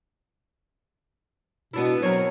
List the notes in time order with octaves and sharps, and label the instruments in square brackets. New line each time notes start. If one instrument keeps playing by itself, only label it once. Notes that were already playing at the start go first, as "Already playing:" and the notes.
[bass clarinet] B2 [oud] B3 D4 E4
[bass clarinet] F#3 [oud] C4 A#4 [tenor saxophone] C#5